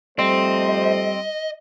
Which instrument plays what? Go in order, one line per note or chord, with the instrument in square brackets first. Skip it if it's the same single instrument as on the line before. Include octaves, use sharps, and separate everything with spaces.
[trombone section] F2 A3 C5 [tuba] G3 [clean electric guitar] C4 [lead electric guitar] D#5